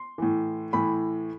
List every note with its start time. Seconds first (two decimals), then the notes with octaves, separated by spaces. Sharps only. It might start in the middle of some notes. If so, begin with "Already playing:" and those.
Already playing: C6
0.18 A2 E3
0.73 A2 E3 B5